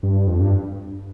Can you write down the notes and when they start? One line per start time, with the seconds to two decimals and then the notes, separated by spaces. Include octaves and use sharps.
0.03 G2
0.27 F2
0.40 G2